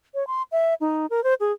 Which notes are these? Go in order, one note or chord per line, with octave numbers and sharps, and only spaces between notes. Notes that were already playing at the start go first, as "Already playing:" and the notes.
C#5
C6
E5
D#4
A#4
C5
G#4